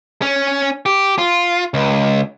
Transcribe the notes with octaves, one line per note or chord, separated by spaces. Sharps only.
C#4
G4
F4
C#2